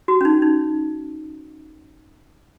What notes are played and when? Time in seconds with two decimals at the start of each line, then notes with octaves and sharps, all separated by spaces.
0.08 F#4
0.21 C#4
0.25 D#4
0.42 D#4